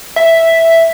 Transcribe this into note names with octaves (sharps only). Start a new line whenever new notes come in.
E5